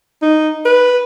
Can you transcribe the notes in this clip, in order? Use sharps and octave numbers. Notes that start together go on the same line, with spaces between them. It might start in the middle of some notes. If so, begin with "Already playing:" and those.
D#4
B4